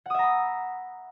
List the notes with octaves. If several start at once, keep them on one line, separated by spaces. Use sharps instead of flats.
E5 F#5 A#5 B5 D#6